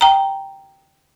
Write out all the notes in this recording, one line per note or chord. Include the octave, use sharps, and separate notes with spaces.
G5 A#5